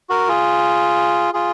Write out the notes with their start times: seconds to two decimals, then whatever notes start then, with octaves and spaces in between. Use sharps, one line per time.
0.10 F#4 A#4
0.28 F4 G#4
1.34 F4 G#4